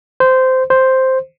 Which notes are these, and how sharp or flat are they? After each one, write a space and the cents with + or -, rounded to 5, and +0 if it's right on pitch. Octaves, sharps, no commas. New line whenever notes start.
C5 -15
C5 +0